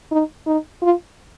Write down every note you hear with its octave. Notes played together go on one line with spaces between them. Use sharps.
D#4
D#4
F4